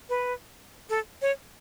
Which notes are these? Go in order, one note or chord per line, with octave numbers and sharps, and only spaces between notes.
B4
A4
C#5